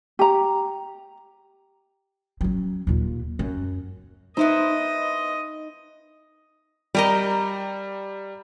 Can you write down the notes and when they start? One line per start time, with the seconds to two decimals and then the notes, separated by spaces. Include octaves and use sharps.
0.19 G4 A#5
2.41 F#3 C#4
2.87 D#2 A#2
3.39 F#2
4.37 B3 D#4 E4 C5 D#5
6.95 G3 G4 A#4 D#5 A#5